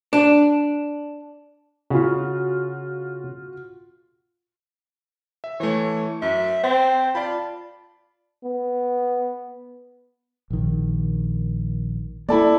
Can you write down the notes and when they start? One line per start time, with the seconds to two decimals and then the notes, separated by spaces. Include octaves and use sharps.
0.13 D4
1.90 C#3 F4 F#4
5.44 E5
5.60 E3 A3 C#5
6.22 F#2 E5
6.63 C4 C5 C6
7.15 F4 D5 A5 B5
8.44 B3
10.50 A#1 D#3
12.29 A#3 E4 A4 D5